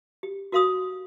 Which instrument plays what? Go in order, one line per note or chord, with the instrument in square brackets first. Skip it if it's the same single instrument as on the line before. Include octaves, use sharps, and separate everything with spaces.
[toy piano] G4
F#4 A#4 F5 C6 D#6 E6